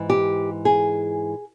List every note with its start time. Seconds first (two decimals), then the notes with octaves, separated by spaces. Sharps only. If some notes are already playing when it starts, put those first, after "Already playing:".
Already playing: G#2 E3
0.10 G4
0.65 G#4